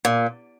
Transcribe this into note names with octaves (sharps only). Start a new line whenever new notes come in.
A#2